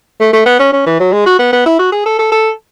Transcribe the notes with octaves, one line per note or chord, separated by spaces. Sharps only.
A3
A3
B3
C#4
C#4
E3
F#3
G#3
F#4
B3
B3
E4
F#4
G#4
A4
A4
A4